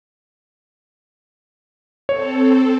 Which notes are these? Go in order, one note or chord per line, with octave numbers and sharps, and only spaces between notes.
C4 A4 C#5